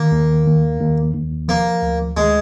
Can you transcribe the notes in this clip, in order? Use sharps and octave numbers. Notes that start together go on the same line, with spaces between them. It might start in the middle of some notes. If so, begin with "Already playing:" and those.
Already playing: D#3 A#3
D#2
D#2
D#2
D#2
F3 A#3
D2
D2 G#3